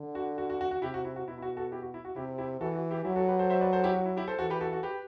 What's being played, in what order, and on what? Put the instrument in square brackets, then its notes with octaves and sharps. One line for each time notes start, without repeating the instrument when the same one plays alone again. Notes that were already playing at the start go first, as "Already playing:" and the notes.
Already playing: [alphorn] D3
[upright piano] F#4
F#4
F#4
F#4
F#4
[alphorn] C3 [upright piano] E4 G4
[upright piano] F#4
E4
F#4
[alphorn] B2 [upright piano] E4
[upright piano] E4
F#4
F#4 A4
E4 G4
F#4
E4
F#4
[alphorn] C3 [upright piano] E4 G4
[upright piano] E4 G4
[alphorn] E3 [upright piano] F#4 A4
[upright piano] F#4
E4 G4
[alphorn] F#3 [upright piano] E4 G4
[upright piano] F#4 A4
G4 B4
A4 C5
C5 E5
B4 D5
A4 C5
E4 G4
F#4
E4
E4 G4
A4 C5
[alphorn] E3 [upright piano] F#4 A4
[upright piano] G4 B4
F#4 A4
F#4 A4
G4 B4